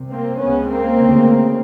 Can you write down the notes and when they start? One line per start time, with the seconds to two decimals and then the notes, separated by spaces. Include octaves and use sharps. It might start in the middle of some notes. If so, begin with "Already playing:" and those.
Already playing: C2 C3
0.10 A#3 C4
0.39 C#2 C#3 B3 C#4
0.68 A#3 C4
0.98 D2 C#3